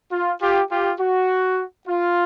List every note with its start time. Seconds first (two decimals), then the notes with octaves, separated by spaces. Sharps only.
0.11 F4
0.40 F4 G4
0.70 F4 G4
0.99 F#4
1.87 F4